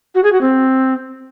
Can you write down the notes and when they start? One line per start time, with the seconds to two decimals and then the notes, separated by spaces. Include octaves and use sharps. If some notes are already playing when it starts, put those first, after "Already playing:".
0.14 F#4
0.23 G#4
0.32 F#4
0.41 C4